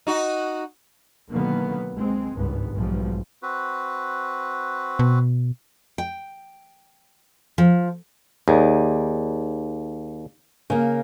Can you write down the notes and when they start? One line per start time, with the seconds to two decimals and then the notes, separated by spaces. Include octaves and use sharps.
0.07 D#4 F#4
1.29 B2 D3 D#3 F#3 A#3 B3
1.95 C#2 G#3 C4
2.36 G#1 C#2 G2 B3
2.75 B1 G#2 F3 G3
3.43 C4 F#4 B4
4.99 B2
5.98 G5
7.58 F3
8.48 D#2 G#4 D5
10.70 C#3 A#3